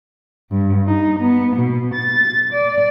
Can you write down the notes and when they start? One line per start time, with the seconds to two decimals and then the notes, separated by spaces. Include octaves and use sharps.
0.50 G2
0.87 D#4
1.20 B3
1.56 B2
1.94 A6
2.52 D5